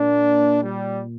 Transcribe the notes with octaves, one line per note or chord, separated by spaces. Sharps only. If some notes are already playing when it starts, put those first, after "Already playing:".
Already playing: A#2 A#3 D4
G3